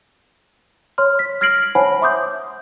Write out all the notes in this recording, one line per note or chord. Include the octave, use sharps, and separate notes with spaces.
C#5 C6 F6
B6
F6 G#6 A#6 C7 D7 F#7
C5 C#5 F#5 G#5 A5 B5
E5 C6 D6 D#6 G6